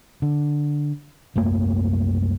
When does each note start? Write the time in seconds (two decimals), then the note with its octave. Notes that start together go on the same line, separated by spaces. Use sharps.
0.22 D3
1.36 C2 F#2 A3 A#3